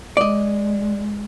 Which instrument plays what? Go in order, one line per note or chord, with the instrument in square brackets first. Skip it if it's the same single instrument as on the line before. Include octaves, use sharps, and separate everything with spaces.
[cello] G#3 [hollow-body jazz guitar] D5 D#5